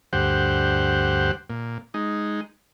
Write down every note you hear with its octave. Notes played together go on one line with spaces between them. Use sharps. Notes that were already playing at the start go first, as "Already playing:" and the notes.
D2 G2 G4 C5 F#5
A#2
G#3 D#4